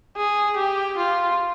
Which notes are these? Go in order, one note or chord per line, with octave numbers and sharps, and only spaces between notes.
G#4
G4
F4